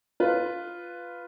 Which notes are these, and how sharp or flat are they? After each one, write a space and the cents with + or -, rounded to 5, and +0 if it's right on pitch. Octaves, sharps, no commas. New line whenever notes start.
F4 +0 B4 +5